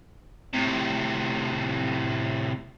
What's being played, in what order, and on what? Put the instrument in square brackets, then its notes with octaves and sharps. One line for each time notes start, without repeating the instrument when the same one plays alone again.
[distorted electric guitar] A2 C3